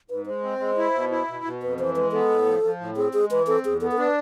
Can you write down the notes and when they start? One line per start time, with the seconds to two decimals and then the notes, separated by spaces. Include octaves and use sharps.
0.10 G#2 B4
0.26 G#3 C5
0.43 C4
0.59 G#3
0.77 E4
0.94 B2
1.11 E4
1.27 B2
1.45 B2
1.62 F2 B4
1.78 E3 C5
1.95 G#3 B4
2.12 B3 A4
2.30 A2
2.46 F3
2.63 F3
2.80 A2
2.96 C4 G#4
3.13 G#3 G#4
3.31 E3 B4
3.47 C4 A4
3.65 E2 G#4
3.81 B3 A4
3.91 A4
3.98 D4 B4